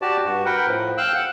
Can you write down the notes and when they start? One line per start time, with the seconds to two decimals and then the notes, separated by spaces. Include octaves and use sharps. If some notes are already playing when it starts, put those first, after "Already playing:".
0.02 F#4 G4 D5 A5
0.25 G2 F#4
0.45 A#4 B4 F#5 G5
0.66 A2 F3
0.98 F5 G5 E6 F#6
1.15 F#5